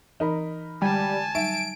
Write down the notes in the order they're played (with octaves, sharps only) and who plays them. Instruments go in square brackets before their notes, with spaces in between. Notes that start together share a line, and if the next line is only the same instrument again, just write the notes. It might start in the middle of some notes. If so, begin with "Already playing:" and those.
[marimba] E3 [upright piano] D#4 A#4 B5
[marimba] D3 G#3 [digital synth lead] G3 [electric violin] G#5 A5
[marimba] F#3 G3 D#4 [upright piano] E5 [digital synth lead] D7